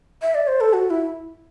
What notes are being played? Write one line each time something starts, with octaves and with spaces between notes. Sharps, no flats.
E5
D5
C5
A4
F#4
E4